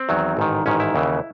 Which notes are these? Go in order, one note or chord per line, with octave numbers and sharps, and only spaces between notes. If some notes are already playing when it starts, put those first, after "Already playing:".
Already playing: C4
E2 D#3 F#3
A1 G#2 D#3
A1 G#2 D#3 C#4
E4
D#2 C#3 E3